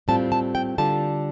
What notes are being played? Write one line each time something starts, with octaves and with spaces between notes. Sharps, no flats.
A2 G3 C4 F4 A5
A5
G5
D3 G3 F4 A5